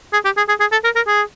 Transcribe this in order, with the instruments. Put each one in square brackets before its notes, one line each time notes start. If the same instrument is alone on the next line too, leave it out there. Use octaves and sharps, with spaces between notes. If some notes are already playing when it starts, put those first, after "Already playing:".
[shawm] G#4
G4
G#4
G#4
G#4
A4
A#4
A#4
G#4